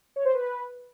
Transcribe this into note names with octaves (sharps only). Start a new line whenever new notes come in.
C#5
C5
B4